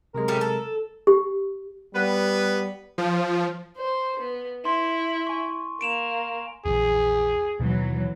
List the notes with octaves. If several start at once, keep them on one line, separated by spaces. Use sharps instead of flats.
C3 F#3 G#3 A#4
A2 C#4 G4
A4
G4
G3 B3 B4
F3
C5
B3
E4 C6
G#5 C#6
A#3 D7 E7 F7
A#1 E2 G#4
D#2 B2 D#3 E3 F#3